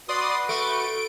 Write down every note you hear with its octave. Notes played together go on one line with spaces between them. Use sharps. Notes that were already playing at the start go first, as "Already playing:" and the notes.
F#4 B4 D5 C6 D#6
A3 D7